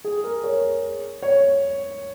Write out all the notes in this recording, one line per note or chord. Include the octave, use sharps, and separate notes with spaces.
G#4
A#4
C#5
C#5